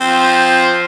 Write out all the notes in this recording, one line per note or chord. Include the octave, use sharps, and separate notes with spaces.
F3 C4 C5